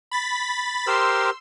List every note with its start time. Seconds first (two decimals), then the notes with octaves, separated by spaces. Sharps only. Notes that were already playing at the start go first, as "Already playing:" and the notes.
0.11 B5 A6 B6
0.87 G4 A#4 C5 C6 E6